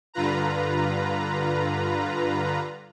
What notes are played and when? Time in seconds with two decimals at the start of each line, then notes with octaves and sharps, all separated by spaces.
0.14 G2 D3 F4 B4 A#5